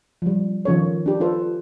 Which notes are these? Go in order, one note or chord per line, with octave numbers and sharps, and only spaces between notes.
F3 G3
D#3 F3 C#4 A4 C#5
D4 G4
F4 A4 B4 C5